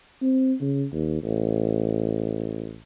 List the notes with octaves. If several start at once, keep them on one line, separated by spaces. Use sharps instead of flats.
C4
C#3
D#2
A1